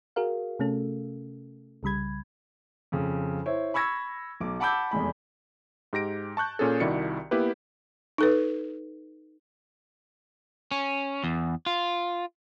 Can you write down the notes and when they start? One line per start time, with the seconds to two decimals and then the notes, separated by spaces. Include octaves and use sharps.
0.16 F#4 G#4 A#4 F5
0.59 C3 A3 C#4 A4
1.83 C2 C#3 G3 B5 G#6
2.92 F2 C#3
3.46 E4 C5 C#5
3.74 B5 C#6 E6 G#6 A#6
4.40 B1 D6
4.60 F#5 A5 B5 D6 E6 G6
4.91 F1 E2 G#3 B5
5.93 G#2 G4 A#6 D7
6.37 A5 C#6 F#6 G6
6.59 A#2 C#4 G#4 A4
6.80 C2 D#3 E4 F#4 D5 C#7
7.31 A#3 B3 E4 G4 B4
8.18 D#4 A4 B4
10.71 C#4
11.24 E2
11.66 F4